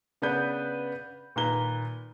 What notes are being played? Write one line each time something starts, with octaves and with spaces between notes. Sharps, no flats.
C#3 B3 D4 B4 G6
A#2 D#3 B4 A#5 G7